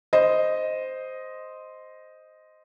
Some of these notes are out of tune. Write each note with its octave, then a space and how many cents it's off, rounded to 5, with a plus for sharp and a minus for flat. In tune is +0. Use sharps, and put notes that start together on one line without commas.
C5 -5 D#5 +0